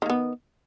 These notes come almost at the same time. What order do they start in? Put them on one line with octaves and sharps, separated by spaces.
D#3 A#3 B3